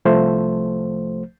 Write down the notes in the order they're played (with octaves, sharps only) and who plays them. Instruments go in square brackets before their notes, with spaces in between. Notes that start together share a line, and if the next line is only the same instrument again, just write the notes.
[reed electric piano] C2 F3 A3 C5